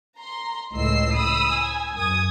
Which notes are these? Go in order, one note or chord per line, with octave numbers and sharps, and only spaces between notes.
A#5 C6
C#2 A2 D#5 E6 C7
B5 D#6 E6
G#5
F#2 D#6 G#6